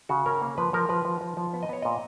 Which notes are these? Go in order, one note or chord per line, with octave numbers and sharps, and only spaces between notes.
C#3 F#4
C#4 A#4
A#3
F3 B4
F3 A#4
F3 B4
F3
F3
F3
B3
D#5
B3 C#5
A#2 D#5